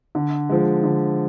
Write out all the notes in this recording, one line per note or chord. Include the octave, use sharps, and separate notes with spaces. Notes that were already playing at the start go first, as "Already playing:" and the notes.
D3
F3 G#3
D3